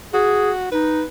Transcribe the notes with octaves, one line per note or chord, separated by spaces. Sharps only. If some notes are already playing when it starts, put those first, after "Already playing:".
F#4 G#4
D#4 B4